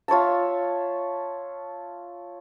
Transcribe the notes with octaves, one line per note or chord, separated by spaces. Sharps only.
F4 C#5 E5 A5